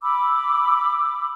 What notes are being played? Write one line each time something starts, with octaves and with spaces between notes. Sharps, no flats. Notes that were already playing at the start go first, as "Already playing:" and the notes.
B5 D6 E6